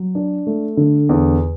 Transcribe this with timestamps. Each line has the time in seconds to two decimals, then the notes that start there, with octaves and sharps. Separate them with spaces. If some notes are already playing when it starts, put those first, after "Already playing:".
Already playing: F#3
0.15 D4
0.47 A3
0.77 D3
1.09 E2